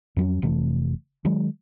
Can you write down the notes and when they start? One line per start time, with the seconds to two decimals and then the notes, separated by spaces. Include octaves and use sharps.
0.16 F2 F#3 C#4
0.42 F1 C3 E3 A3
1.25 D#3 F#3 G#3